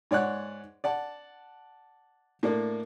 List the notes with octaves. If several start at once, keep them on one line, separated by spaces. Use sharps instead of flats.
G#2 C#5 D5 F#5 F#6
D5 F#5 A5
A2 A#3 D4